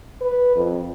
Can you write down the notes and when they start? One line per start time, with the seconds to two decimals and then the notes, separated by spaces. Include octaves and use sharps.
0.21 B4
0.56 F2